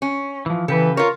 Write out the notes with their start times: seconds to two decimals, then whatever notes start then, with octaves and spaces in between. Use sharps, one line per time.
0.02 C#4
0.46 E3 F3
0.68 C#3 E3 G4 A4 B4
0.97 F4 A#4 C#5